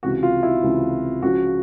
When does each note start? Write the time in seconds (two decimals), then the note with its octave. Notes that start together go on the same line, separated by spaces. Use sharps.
0.03 C#2 C3 E3 F#4
0.23 F4
0.43 E4
0.63 C#2 C3 E3
1.22 C#2 C#3 F3 F#4